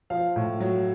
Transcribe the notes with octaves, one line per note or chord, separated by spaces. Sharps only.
F3 F5
A2
F#3